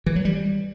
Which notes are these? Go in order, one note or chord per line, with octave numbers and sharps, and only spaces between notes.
E3
F#3
G3